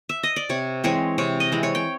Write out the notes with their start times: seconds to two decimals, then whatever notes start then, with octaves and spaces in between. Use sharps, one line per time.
0.09 E5
0.23 D#5
0.36 D5
0.49 C3 C#5
0.84 E3 G#3 C4 C#5
1.18 C3 C#5
1.40 D#5
1.52 E3 G#3 C4
1.63 C#5
1.75 G5